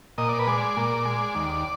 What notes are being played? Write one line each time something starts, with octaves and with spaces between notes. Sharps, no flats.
A#2 D#5
D5
B4
G#3 D5
A#2
G#3
D#2